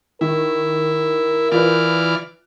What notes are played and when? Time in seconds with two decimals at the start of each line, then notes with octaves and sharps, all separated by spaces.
0.21 D#3 E4 A#4
1.52 E3 F4 B4 D5 F6